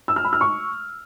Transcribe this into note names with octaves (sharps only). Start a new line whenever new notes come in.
E6
F6
B5
F6
C#6